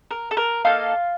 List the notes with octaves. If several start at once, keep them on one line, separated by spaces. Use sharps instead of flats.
A#4
A4
A#4
A#3 D#4 F4 A4 F5